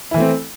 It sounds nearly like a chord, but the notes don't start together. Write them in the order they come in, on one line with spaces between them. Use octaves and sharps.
E4 E3 A3 C4